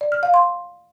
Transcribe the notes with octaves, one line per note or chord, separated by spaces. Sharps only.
D5
F6
F5
C6